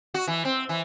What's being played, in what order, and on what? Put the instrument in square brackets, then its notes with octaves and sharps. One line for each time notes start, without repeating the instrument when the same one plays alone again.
[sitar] F#4
E3
C4
E3